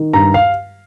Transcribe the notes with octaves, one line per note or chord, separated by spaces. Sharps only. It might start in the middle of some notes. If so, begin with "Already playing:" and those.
Already playing: D#3
G2 A#5
F5